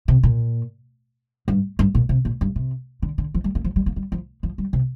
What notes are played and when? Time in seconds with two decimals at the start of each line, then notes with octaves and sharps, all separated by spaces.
0.08 C3
0.23 A#2
1.48 G2
1.79 G2
1.95 A#2
2.09 C3
2.25 A#2
2.41 G2
2.56 C3
3.02 D3
3.18 D3
3.35 F3
3.44 G3
3.55 A#3
3.64 F3
3.76 G3
3.86 A#3
3.96 G3
4.12 F3
4.43 F3
4.58 G3
4.73 C3